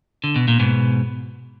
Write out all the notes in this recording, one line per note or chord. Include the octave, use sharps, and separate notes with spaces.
D3
B2
A#2
G#2 B2